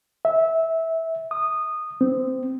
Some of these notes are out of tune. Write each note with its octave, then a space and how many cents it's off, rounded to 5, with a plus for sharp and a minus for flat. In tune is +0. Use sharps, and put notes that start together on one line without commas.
E5 -15
D#6 -15
C4 -20